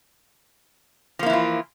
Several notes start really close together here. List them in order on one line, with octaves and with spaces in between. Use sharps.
F3 A#3 E4 E3 F4